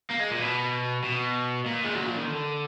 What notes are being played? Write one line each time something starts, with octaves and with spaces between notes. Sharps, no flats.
A#3
G#3
A#2
B2
B2
A#2
G#3
F#3
F3
D#3
D3